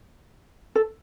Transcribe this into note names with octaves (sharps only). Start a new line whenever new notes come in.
A4